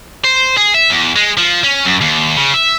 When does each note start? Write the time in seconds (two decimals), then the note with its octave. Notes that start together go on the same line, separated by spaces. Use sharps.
0.24 C5
0.57 G#4
0.74 E5
0.90 E2
1.16 G#3
1.37 F3
1.64 C#4
1.85 F#2
2.01 D#2
2.37 C#3
2.54 E5